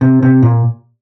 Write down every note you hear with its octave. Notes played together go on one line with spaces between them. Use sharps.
C3
C3
A#2